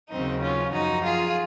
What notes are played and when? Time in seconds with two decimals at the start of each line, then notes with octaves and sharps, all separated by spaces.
0.10 D#2 C#3 F#3 C4 D#4
0.42 C#4 F4
0.73 F#2 F3 D#4 F#4
1.04 F4 G#4